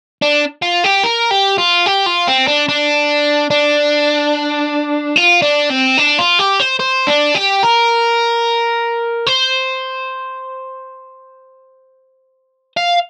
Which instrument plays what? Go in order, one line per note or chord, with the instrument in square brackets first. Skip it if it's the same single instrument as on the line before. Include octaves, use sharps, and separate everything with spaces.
[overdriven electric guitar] D4
F4
G4
A#4
G4
F4
G4
F4
C4
D4
D4
D4
F4
D4
C4
D4
F4
G4
C5
C5
D4
G4
A#4
C5
F5